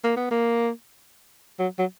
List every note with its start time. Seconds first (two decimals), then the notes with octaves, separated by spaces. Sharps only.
0.04 A#3
0.16 B3
0.31 A#3
1.59 F#3
1.78 F#3